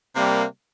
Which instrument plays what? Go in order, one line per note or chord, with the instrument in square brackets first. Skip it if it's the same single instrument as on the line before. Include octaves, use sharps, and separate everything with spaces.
[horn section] C3 G3 A#3